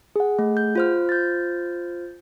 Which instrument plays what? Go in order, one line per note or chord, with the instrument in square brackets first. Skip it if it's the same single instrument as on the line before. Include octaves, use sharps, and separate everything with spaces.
[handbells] G#4 F#5
[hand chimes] A3
G6
F4 C5 F6
[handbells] G6 A6